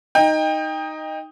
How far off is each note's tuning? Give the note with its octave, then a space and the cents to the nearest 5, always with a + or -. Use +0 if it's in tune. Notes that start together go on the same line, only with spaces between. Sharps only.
D#4 +0 G5 +25